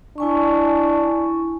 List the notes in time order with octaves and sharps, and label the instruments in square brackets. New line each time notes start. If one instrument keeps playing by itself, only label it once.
[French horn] D4 [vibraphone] E4 G#5 C#6